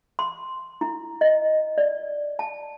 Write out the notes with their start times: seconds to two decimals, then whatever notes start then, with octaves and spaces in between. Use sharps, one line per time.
0.19 C6
0.81 E4
1.21 D#5
1.78 D5
2.39 A5